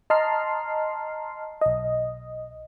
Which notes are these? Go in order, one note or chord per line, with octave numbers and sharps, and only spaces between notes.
D#5 A5 A#5 C6 F6 C7
B1 D#5